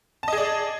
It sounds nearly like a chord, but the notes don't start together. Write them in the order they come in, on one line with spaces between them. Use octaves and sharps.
A5 D#5 G#4 D5